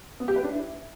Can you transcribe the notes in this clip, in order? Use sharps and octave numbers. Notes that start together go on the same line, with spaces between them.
B3
G4
B4
D4
E4